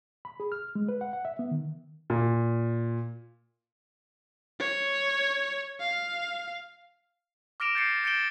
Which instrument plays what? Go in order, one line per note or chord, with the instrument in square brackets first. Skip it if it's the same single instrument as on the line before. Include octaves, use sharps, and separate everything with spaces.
[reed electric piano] B5
G#4
F6
G#3
B4
F#5
F#5
E5
B3
D#3
[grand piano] A#2
[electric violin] C#5
F5
[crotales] D6 F6 A#6 D7 E7 F7
G6 A6 C7 C#7
G6 A6 C#7 D7 E7 G7